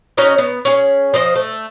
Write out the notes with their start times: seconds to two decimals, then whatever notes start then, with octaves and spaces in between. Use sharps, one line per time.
0.17 C#4 D#4 F#4 D#5
0.38 B3
0.65 C#4 G#4
1.14 F3 C5 D#5
1.36 A3